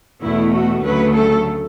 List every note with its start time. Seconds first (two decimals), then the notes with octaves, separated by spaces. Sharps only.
0.22 E2 B2 A3 E4
0.54 F#4
0.84 D2 C#3 F#3 A3 B4
1.16 A4